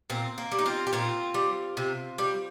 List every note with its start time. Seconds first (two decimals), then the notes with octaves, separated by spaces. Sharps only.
0.10 A#2 C4
0.38 A#3
0.52 G3
0.59 D#4
0.66 C4 F4
0.87 G4
0.93 A#2 C4 F4
1.34 G3
1.77 C3
2.18 G3